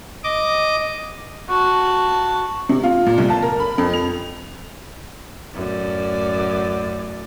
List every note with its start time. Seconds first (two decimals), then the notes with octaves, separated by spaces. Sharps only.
0.24 D#5 D6
1.48 F#4 A5
2.69 C3
2.83 F4
3.06 A#2
3.18 C2
3.30 A5
3.43 A#4
3.60 B5
3.78 F2
3.93 F7
5.54 F#2 A2 D5